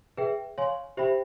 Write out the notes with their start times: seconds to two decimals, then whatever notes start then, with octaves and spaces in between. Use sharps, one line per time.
0.17 G#4 B4 E5 G5
0.58 C#5 F5 G#5 C6
0.97 G4 C5 E5 G5 B5